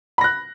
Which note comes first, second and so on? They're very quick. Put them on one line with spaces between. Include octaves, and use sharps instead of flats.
B5 A#6 F#6